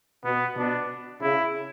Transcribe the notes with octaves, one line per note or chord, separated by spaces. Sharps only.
B2 B3
B2 D4
C#3 E4